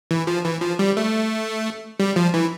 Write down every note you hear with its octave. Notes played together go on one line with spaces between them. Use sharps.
E3
F3
E3
F3
G3
A3
G3
F3
E3